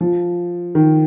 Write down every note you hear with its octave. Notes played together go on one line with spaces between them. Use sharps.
F3
D#3